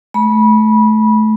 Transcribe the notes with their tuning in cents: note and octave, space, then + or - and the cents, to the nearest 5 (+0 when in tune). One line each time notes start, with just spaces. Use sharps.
A3 -25 B5 -25